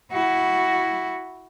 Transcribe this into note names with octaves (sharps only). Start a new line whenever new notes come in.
E4 F#4